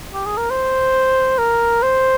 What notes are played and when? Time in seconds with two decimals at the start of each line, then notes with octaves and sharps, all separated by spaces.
0.14 G4
0.26 G#4
0.37 A#4
0.50 C5
1.38 A#4
1.82 C5